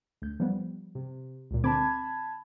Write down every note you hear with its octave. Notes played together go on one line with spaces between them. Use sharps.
D2 G6
F3 G3 B3
C3
C#2 A#2
D3 C4 A5 B5 D6 G#6